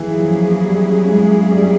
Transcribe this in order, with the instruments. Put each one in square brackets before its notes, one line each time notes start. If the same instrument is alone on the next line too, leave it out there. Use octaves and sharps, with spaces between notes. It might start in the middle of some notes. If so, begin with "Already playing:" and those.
Already playing: [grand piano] E3 [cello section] F#3 A#3 C#4 E4 G#4
[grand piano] F3
G3
G#3
G3